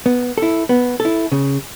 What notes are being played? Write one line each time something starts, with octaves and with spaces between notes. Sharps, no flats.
B3
E4 A4
B3
A4
E4
C#3